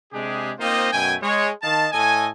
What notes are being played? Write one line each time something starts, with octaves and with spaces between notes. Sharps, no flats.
C3 G#3 D4 G4 G#4
A#3 C4 D#4 F4 C5 D#5
F#2 B2 A3 G5 G#5
G#3 C#5
D#3 D#5 F5 A5
A2 A4 D#5 G#5